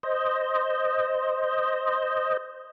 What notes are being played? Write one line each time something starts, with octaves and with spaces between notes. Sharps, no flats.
C5 D#5